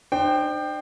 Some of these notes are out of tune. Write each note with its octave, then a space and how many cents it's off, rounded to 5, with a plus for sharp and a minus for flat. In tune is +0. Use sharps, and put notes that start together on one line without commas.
D4 +45 C5 +0 G5 +0